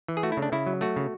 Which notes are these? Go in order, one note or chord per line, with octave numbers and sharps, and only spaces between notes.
E3
G#4
A3 F#4
E4
C#3
D4
C#3 E4
F#3
A3 F#4
C#3